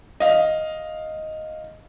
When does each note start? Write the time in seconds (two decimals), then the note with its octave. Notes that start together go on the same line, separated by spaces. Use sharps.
0.20 D#5 F5